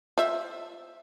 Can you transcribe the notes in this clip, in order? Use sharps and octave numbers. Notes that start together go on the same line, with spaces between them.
F4 C5 E5